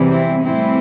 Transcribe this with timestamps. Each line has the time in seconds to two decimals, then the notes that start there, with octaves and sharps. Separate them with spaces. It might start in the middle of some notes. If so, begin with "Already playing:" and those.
Already playing: E2 C3 E3 G3
0.10 C4 E4
0.44 A2 E3 G3 C4 E4